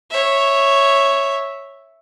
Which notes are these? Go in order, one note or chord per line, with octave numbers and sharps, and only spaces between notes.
C#5 E5